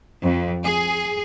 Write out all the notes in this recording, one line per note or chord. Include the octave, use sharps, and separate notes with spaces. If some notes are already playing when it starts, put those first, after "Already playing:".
F2
G#4